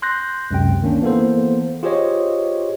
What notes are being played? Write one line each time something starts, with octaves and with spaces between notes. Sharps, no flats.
C6 F#6 G6 A#6
C#2 F#2 C3 G5
D#3 A#3 C#4 D4
E3 A#3 B3 A4 C5
F4 G4 G#4 C5 C#5 D#5